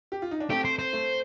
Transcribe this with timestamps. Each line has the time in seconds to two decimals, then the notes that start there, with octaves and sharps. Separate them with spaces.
0.12 G4
0.22 F4
0.31 D#4
0.40 D4
0.50 A3 C4 G4
0.65 C5
0.79 C5
0.93 A3